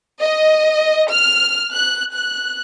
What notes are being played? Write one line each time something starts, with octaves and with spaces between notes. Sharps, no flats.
D#5
F6
F#6
F#6